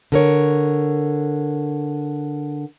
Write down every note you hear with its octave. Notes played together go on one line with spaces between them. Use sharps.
D3 A#4 C#5